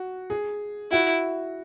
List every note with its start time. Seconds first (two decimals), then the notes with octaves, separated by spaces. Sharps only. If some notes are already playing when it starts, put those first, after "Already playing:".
Already playing: F#4
0.30 G#4
0.91 E4 F#4